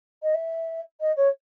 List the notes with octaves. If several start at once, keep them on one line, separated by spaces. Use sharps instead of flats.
D#5
E5
D#5
C#5